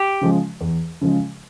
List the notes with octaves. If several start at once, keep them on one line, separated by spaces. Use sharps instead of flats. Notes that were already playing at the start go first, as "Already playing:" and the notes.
Already playing: G4
C#3 F3 G#3
E2
C#3 F3 G#3